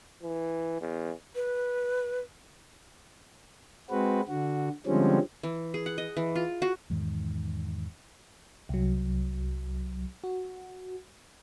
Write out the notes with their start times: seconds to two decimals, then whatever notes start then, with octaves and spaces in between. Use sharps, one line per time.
0.23 E3
0.81 E2
1.35 B4
3.90 G#3 C4 F#4 B4
4.28 D3 F#4
4.86 D3 F3 G3 G#3 C4 C#4
5.43 E3
5.74 G#4
5.86 F#5
5.98 D#5
6.17 E3
6.35 F4
6.62 F#4
6.90 E2 G#2 D#3
8.69 C2 F#3
10.24 F#4